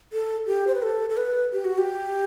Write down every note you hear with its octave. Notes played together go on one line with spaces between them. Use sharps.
A4
G4
C5
B4
A4
A4
B4
G4
F#4
G4